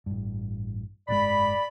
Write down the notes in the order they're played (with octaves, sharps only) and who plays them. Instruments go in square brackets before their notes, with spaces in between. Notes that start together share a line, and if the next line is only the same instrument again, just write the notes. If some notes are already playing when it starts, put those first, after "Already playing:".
[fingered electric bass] A1 G2
[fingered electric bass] F#1 G#2 G#3 [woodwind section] D5 B5